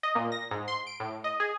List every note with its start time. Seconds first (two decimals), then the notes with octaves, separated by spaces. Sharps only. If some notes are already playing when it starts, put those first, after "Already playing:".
0.03 D#5
0.15 A#2
0.32 A#6
0.51 G#2
0.68 C6
0.87 D7
1.00 A2
1.24 D#5
1.40 G#4